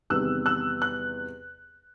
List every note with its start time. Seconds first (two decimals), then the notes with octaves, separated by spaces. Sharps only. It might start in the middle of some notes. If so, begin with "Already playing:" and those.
0.10 E2 C3 D#3 G3 E6 F#6
0.46 E6 F#6
0.82 F#6